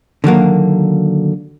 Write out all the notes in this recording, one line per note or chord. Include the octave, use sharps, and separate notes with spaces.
D3 D#3 F#3 A#3